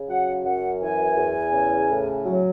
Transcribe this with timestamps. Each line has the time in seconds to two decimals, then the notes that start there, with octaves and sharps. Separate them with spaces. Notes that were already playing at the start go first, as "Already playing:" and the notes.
Already playing: C#3
0.09 F#3 F#5
0.45 F#2 F#5
0.81 E3 G#5
1.17 E2
1.53 C#3
1.90 A2
2.26 F#3